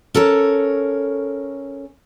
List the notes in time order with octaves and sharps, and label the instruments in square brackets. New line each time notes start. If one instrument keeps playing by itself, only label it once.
[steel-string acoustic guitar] C#4 A4 A#4 C#5